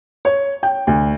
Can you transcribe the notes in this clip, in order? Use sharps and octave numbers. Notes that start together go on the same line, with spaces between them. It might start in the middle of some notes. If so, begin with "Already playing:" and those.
C#5
G5
D2